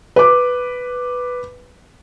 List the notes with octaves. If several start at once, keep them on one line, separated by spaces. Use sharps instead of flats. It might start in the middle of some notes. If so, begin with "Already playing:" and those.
B4 D6